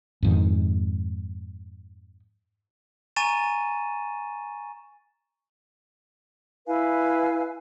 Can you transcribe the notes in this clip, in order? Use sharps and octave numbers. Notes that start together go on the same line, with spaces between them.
F2 G#2 D#3
G#5 A#5 C#6 A6 D#7 E7
E4 B4 F5 G#5